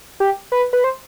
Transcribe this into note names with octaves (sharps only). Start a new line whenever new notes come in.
G4
B4
B4
C5